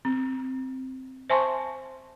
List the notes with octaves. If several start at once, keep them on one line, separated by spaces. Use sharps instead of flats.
C4
C5 E5 G#5 A5 C6 C#6